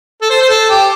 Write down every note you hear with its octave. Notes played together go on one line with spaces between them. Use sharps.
A4
C5
C5
A4
G4